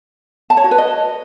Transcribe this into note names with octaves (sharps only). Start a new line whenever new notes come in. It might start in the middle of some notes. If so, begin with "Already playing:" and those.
A5
C#5
F#4
B4
D#5